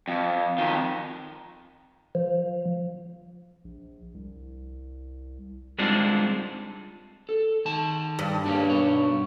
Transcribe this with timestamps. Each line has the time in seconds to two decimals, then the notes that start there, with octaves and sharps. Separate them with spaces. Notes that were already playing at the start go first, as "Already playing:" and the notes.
0.08 F2
0.58 F2 D#3
2.15 F3
3.64 A#1
4.14 C2
5.78 G3 G#3 C4 D4 D#4 F4
7.29 A4
7.65 D#3 A5
8.19 G2
8.46 G3 A#3 C#4
8.70 B2 C#5